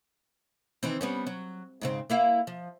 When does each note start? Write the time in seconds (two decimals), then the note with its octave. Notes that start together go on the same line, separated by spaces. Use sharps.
0.83 D#3 E3 C4
1.01 G3 B3 C#4
1.27 F#3
1.81 G#2 C#3 C4
2.10 A#3 E4 F5
2.47 F3